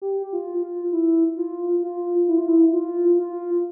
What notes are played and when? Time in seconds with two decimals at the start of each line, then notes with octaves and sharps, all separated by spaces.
0.02 G4
0.33 F4
0.62 F4
0.92 E4
1.37 F4
1.83 F4
2.28 E4
2.38 F4
2.48 E4
2.73 F4
3.19 F4